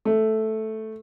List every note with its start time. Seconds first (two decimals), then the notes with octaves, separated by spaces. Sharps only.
0.05 A3